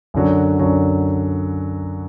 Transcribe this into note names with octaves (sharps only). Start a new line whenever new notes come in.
F#2 D3 F#3
F#2 D3 F#3